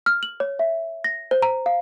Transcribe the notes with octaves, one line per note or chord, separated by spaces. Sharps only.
F6
F#7
C#5
E5
A#6
C5
A#5
F5